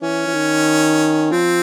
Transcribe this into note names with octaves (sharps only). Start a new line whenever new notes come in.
E3 C#4
E3
D#3
F3 C4